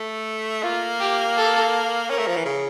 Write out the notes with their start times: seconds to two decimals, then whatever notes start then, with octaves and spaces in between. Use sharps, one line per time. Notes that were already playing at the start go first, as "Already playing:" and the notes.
Already playing: A3
0.63 A#3 F4
1.00 G4
1.37 A4
2.10 C#4 A#4
2.18 A3
2.27 F3
2.36 E3
2.45 C#3